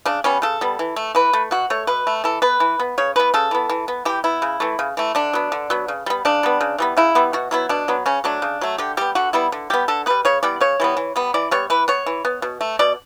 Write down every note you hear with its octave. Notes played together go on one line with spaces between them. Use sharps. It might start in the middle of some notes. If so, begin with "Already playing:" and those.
C#3 D4
G3 B3 C#4
C#3 A4
G3 B3
E3
A3
E3 B4
A3
B2 F#4
A3 C#5
B2 B4
A3
E3 A4
B3 B4
E3
B3
C#3 C#5
E3 B3 B4
C#3 A4
E3 B3
E3
B3
E3 G4
B3 E4
C#3
E3 A3
C#3
E3 A3
D3 D4
F#3 B3
D3
F#3 B3
C#3
G3 B3
C#3 D4
G3 B3
C#3
E3 G3 B3
C#3 E4
E3 G3 B3
B2 F#4
F#3 B3 E4
B2 D4
F#3 B3
C#3 C#4
F#3 A3 D4
C#3
F#3 A3
D3 G4
G3 B3 G4
D3 F#4
G3 B3 E4
D3
G3 B3 G4
D3 A4
G3 B3 B4
C#3 C#5
E3 G3 B3 D5
C#3 C#5
E3 G3 B3
E3
G3 B3
E3 D5
G3 B3 C#5
E3 B4
B3 C#5
E3
B3
B2
A3
B2 D5